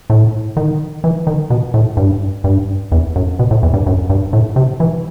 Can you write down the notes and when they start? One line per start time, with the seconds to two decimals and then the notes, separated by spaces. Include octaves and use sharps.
0.10 A2
0.57 D#3
1.04 E3
1.27 D#3
1.50 B2
1.74 A2
1.97 G2
2.44 G2
2.92 E2
3.16 F#2
3.39 B2
3.51 A2
3.63 E2
3.74 G2
3.86 F#2
4.10 G2
4.33 A2
4.56 C3
4.80 E3